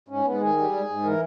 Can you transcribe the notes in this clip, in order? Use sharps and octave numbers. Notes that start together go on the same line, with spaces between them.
G#2 C#4
G#2 B3
D#3 G#4
G3
G#2
G#2
E3 A#4